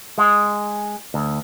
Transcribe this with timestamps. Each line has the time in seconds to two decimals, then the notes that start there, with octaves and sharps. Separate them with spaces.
0.18 G#3
1.14 D2